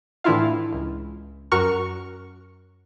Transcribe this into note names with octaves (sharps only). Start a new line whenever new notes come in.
A2 E3 D4 E4 F4 F5
C#2
F#2 F#4 A#4 C#6 F6